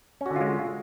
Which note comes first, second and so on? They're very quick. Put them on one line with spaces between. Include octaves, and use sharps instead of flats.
C#4 F#4 D3 F4 G#3